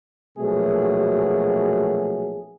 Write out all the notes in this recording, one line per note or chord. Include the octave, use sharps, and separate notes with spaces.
A#1 B2 F#3 A3 G#4